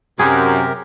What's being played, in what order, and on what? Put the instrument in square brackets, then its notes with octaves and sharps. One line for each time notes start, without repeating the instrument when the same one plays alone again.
[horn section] F#2 [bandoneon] C3 G4 A#4 [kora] G#4